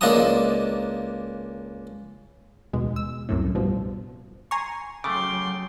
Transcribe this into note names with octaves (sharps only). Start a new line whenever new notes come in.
C#2 A#3 D4 D#5 A5 D#6
D#2 B2 G#3
E6
C2 F#2 A2
G2 B2 F3
G#5 A#5 C6 C#6
C#3 F#3 A3 G5 C6 D6